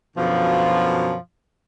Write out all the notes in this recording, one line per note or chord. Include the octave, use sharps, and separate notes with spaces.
F#2 B2 D3 F3